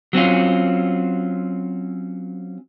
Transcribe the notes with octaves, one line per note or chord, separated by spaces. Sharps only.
F#3 C4 C#4 F4